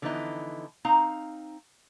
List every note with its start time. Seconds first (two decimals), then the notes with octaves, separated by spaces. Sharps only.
0.02 D3 E3 F3 B3 D#4 E4
0.85 C4 D#4 F5 A#5